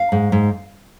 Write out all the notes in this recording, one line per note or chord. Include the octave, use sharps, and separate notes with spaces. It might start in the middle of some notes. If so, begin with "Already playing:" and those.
Already playing: F5
G#2
G#2